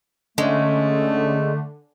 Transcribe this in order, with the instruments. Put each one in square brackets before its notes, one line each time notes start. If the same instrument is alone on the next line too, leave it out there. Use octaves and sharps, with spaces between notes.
[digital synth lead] D3 [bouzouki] G#3 [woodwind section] A3 [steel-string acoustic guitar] C#4